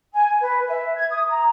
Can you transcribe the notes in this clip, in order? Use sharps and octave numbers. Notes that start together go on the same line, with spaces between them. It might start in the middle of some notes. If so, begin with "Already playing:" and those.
G#5
B4
E5
G#6
D#6
A#5